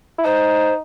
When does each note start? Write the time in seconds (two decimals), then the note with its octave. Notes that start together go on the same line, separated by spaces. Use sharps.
0.18 E4
0.25 D#4 C5